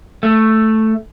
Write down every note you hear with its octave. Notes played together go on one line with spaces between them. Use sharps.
A3